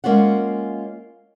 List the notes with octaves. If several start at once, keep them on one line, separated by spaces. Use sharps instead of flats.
G#3 A#3 C#4 F4 F#5